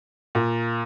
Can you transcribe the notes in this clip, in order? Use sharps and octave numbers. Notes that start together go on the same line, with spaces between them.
A#2